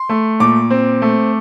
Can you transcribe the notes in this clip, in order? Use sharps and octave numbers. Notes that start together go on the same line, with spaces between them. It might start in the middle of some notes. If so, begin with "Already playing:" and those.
Already playing: C6
A3
A#2 D6
C4
A3